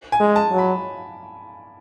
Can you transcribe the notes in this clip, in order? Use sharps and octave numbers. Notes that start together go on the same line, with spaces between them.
G#5
G#3
A5
F#3
B5